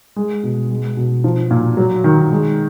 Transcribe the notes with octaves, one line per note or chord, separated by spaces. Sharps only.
G#3
B2
G#3
B2
F3
A#2
F#3
D#3
G#3